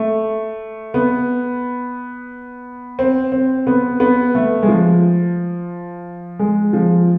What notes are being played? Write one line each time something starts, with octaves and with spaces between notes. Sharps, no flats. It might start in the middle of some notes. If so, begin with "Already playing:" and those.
Already playing: A3
B3
C4
C4
B3
B3
A3
G#3
F3
G#3
F3